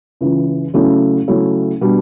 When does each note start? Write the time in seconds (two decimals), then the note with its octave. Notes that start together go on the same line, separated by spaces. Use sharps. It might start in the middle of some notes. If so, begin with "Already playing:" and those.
0.21 C#2 C#3 E3
0.74 C#3 F#3 A3 C#4 E4
1.27 C#3 F#3 A3 C#4 E4
1.81 B2 G3 D4